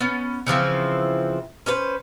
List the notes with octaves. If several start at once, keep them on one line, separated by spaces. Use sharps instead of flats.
B3 C#4
C#3 E3 F3 C4
C#4 D4 B4 C5